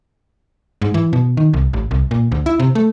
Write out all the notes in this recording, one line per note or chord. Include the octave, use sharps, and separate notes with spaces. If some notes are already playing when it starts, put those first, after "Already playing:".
G#2
E3
B2
D#3
C2
A1
C2
A#2
D2
E4
C3
A3